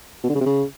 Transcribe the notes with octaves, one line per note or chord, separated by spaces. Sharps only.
B2
D3
C#3
C3
C#3